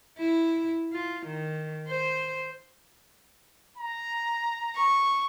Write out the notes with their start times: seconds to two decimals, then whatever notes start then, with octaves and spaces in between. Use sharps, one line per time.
0.19 E4
0.93 F4
1.27 D#3
1.88 C5
3.78 A#5
4.75 C#6